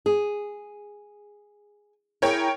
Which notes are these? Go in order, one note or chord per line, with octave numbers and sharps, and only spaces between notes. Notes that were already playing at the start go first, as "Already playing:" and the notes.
G#4
E4 G#4 A#4 C#5 G5